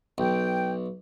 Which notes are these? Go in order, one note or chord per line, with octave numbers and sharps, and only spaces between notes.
B1 G5